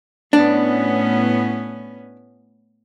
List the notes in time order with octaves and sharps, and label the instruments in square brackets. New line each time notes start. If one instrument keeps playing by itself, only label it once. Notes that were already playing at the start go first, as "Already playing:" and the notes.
[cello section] A2 B3 C#4 [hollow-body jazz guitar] D4